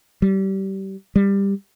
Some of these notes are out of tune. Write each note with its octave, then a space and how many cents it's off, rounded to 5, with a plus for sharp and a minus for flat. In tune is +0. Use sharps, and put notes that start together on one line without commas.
G3 -25
G3 +15